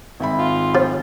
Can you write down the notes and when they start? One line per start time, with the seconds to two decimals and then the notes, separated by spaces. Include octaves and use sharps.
0.20 G#1 E5 B5
0.38 F4
0.75 F3